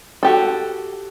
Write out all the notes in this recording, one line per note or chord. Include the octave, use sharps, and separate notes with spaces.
F#4 G4 A4